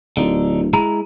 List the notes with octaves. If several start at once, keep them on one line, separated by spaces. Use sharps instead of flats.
D1 D3 D#4
G#3 E4 A#5